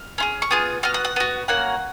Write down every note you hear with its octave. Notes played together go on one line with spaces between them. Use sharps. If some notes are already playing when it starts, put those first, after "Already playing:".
Already playing: F6
C#4 F4 G#4
C#6
B3 F4 G#4 D#6
B3 F#4 F6
F#5
F#5
B3 F#4
A#3 C#4 F#4 F#5